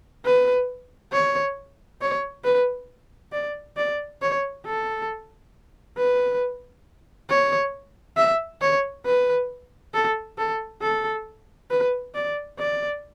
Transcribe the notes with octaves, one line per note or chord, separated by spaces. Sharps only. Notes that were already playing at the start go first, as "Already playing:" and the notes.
B4
C#5
C#5
B4
D5
D5
C#5
A4
B4
C#5
E5
C#5
B4
A4
A4
A4
B4
D5
D5